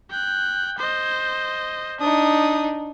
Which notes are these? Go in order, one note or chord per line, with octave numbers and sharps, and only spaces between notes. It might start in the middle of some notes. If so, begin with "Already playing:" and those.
G5 F#6
C5 D#5
D4 D#4 D#6